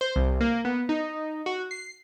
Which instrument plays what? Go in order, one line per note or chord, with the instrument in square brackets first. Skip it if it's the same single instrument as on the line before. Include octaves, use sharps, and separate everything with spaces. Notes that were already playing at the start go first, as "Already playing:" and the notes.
[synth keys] C5
C2
A#3
B3
D#4
F#4
C7